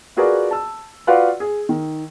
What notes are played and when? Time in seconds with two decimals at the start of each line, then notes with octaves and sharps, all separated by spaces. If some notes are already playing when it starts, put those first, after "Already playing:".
0.17 F4 F#4 G#4 A#4 B4 D5
0.51 A5 E6
1.07 F4 F#4 B4 D5 F5 F#5
1.40 G#4
1.69 D#3